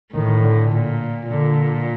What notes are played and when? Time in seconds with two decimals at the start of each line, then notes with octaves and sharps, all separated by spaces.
0.13 A2 D#3
0.42 D3
0.71 A#2
1.29 A#2 D3